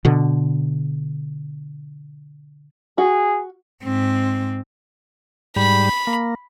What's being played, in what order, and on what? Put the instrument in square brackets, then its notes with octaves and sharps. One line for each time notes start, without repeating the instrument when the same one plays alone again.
[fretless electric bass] B2 D3
[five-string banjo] F#4 [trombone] G#4
[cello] G#2 C4
[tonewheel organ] G#2 G3 [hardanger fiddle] B5
[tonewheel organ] A#3